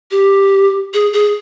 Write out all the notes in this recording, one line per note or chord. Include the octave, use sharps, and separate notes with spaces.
G4
G#4
G#4